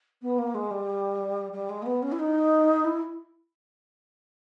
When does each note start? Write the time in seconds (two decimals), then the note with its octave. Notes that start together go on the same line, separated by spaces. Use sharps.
0.22 B3
0.38 A#3
0.54 G#3
0.70 G3
1.52 G3
1.69 G#3
1.82 A#3
1.86 B3
2.02 C#4
2.11 E4
2.19 D#4
2.84 E4